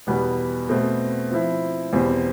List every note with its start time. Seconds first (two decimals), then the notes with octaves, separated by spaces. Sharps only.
0.07 E2 B2 G3 B3
0.69 B2 A3 C4
1.31 F3 C4 E4
1.93 E2 B2 G3 C4